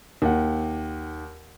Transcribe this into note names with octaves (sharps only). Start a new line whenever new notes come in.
D#2 F#5